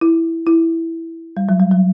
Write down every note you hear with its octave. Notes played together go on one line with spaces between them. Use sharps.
E4
E4
G3
F#3
G3
F#3